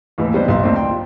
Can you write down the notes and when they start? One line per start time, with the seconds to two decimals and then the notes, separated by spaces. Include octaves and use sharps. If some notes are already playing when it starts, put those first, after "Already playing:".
0.18 D#2 A2 E3
0.34 G3 B3 D4 C5 D#5
0.48 B1 A#2 C6
0.63 D#2 A2 A#3 C4 D4
0.75 D5 G5 C6
0.91 F4